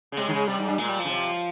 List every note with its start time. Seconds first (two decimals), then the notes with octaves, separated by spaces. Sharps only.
0.12 C#3
0.17 C3 G#3
0.28 D#3
0.33 C#3
0.47 C3 G3
0.59 G#2
0.68 G2
0.78 A#2 G#3
0.89 G3
0.99 F3
1.05 C#3
1.09 C3